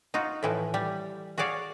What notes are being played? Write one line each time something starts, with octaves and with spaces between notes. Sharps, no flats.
D#4 F4 F#4
A2 E3 F3
G3
F#4 G#4 C#5 D5 F5